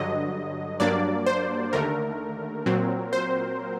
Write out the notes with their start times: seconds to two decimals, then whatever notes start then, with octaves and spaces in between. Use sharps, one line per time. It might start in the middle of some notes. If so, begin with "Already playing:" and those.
Already playing: G2 D3 F#3 D#5
0.80 G2 F#3 A#3 D4 D5
1.26 C5
1.73 D#2 D3 A3 A#4
2.66 A#2 F#3 C4
3.13 C5